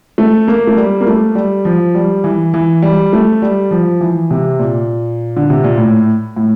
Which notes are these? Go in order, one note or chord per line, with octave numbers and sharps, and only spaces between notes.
A3
A#3
A3
G3
A#3
A3
G3
F3
G3
E3
E3
G3
A3
G3
F3
E3
C3
A#2
D3
C3
A#2
A2
A2